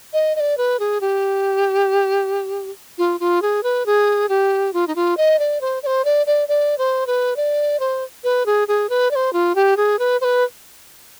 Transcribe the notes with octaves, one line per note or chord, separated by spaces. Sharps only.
D#5
D#5
D5
B4
G#4
G4
F4
F4
G#4
B4
G#4
G4
F4
D#4
F4
D#5
D5
C5
D5
C5
D5
D5
D5
C5
B4
D5
C5
B4
G#4
G#4
B4
D5
C5
F4
G4
G#4
B4
C5
B4